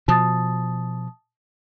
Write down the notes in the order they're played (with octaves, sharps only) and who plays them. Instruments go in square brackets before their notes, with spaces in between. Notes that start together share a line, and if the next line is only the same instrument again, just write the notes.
[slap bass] B2 F3 [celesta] A5 D#6 A6